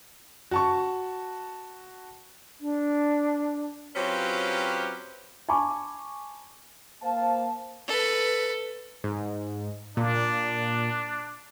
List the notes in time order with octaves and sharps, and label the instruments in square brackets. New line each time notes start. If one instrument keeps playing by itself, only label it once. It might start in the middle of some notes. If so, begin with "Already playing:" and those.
[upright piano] F#4 A5 C#6
[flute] D4
[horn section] F#3 C4 C#4 F4 G4 B4
[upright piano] G#5 A5 B5 C#6 D6
[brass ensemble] A#3 C5 F5 A5
[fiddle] A4 B4
[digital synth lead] G#2
[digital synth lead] A#2 [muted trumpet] D4